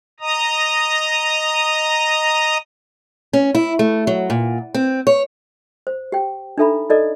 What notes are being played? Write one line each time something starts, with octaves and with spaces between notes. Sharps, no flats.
D#5 A#5 D#6
C#4
E4
A3
F#3
A#2
C4
C#5
C5
G4 G5
D4 D#4 A4 E5 A#5 B5
D#4 A4 A#4 D5 D#5